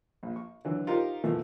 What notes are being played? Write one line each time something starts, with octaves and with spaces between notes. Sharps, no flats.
A#1
C#6
D3 E3 F#3
D#4 F4 G4 A#4 C5
B2 E3 F3 A3 A#3